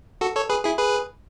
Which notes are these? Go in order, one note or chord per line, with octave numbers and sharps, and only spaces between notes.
F#4 A4
A4 C#5
G#4 B4
E4 G#4
G#4 B4